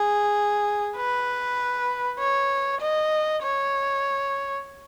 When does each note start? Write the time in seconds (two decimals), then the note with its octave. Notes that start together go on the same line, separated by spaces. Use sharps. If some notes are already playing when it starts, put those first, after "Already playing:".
Already playing: G#4
0.96 B4
2.19 C#5
2.80 D#5
3.43 C#5